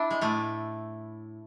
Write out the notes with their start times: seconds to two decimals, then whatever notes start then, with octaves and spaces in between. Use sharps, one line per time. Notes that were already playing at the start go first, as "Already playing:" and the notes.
Already playing: D4 E4
0.11 G#3
0.21 A2 A3